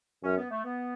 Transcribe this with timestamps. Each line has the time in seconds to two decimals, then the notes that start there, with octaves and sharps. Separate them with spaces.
0.24 F#2 C#4
0.37 B3
0.50 A3
0.64 B3